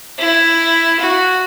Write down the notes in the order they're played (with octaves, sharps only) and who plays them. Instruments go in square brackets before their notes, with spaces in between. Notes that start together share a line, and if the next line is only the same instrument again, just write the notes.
[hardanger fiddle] E4
F#4